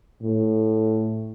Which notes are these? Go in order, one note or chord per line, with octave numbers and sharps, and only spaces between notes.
A2